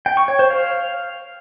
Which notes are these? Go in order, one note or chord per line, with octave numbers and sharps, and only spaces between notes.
G5
C#6
C#5
C5
F5